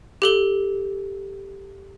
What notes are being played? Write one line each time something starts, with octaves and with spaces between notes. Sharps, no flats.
G4 A4 G7